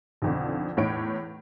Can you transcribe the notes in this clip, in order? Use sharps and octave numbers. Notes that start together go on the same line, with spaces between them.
B1 F2 D3
E2 A2 D#4 C#5 D7